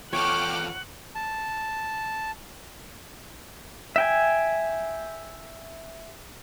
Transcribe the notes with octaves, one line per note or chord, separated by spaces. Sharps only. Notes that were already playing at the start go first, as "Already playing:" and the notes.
E2 F4 A4 C#5 F#5 G5 D6 F6
A5
E5 G5 G#5